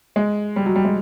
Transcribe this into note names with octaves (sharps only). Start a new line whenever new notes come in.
G#3
G3
F#3
G3
G#3